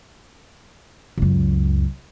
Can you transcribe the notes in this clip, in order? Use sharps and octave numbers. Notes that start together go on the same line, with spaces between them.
C#2 F#2